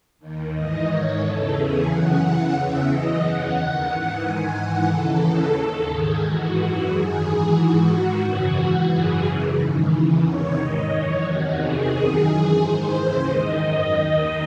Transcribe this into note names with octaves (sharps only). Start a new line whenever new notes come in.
D#2 D#3
G#2 E3 D#5
G#2 D#3 C#5
E2 C#3 E3 A4
E2 C#3 E3 G#4
F#2 C#3 E3 F#5
E2 C#3 E3 F#5
E2 C#3 E3 E5
F#2 E3 D#5
E2 C#3 E3 F#5
D#2 D#3 F#5
G#2 E3 F#5
G#2 D#3 G#5
G#2 E3 F#5
D#2 C#3 E3 A4
D#2 C#3 E3 A4
D#2 D#3 A4
G#2 D#3 G#4
G#2 E3 F#4
F#2 E3 F#4
F#2 D#3 G#4
G#2 E3 G#4
G#2 E3 F#4
G#2 D#3
F#2 C#3 E3
G#2 E3
F#2 C#3 E3 G#4
F#2 C#3 E3
G#2 D#3
E2 C#3 E3
E2 C3 D#3 C#5
G#2 D#3 D#5
F#2 E3 C#5
E2 C3 D#3 F#4
E2 C3 D#3 G#4
F#2 D#3
F#2 E3
G#2 D#3 C5
D#2 C#3 E3
G#2 D#3 D#5
F#2 D#3
D#2 D#3